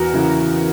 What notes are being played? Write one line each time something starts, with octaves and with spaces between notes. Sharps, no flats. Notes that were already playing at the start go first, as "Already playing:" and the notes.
Already playing: E2 F#4 A#4
C#3 E3